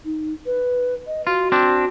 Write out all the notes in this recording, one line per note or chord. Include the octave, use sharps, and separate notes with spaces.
D#4
B4
D#5
F4 F#4
C4 D4